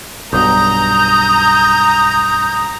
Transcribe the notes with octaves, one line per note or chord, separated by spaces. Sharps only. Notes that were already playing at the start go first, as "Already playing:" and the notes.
B1 G2 B2 A#5 D#6 G6